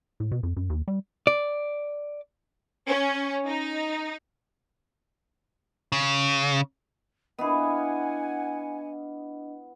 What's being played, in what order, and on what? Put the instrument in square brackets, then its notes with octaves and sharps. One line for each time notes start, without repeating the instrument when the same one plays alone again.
[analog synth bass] A2
B2
F2
F#2
D#2
G3
[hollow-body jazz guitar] D5
[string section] C#4
D#4
[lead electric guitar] C#3
[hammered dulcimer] B3 E4 F5 [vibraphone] D4 D#5 [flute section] F#5 G#5